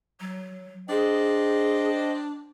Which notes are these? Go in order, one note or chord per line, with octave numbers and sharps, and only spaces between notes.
F#3
D4 G#4 C5 D#5 G5